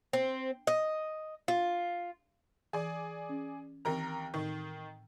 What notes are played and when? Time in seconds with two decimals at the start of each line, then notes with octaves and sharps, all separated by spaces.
0.13 C4
0.67 D#5
1.48 F4
2.73 E3 G#4 D5
3.29 C#4
3.85 D#2 E3 C4 A#4 A#5
4.34 A2 D#3 C#6